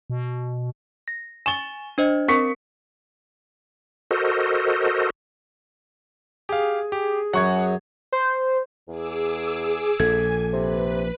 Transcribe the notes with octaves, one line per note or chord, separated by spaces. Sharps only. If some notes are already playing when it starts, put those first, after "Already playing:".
B2
A#6
G#5 C#6 A6 E7 G7
D4 C5 D#5
C4 A#4 C#6 B6 C#7
F#4 A4 A#4 C5 D#5
G4 G#4 F5
G4
F#2 F#3 F#5 C#6 G#6
C5
E2 G#4 D6 E6
A#1 A#2 A4 G#5 G#6
C3 B4